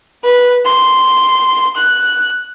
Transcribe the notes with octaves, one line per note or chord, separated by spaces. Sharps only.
B4
C6
F#6